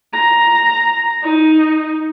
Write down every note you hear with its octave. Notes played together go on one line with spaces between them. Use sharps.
A#5
D#4